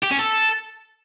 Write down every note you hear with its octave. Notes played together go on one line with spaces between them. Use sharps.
G4
C#4
A4